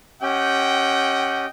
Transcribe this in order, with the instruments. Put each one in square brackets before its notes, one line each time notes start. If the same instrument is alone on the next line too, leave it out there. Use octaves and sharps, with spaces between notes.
[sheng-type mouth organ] C#4 G4 [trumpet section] D#5 F#5 G5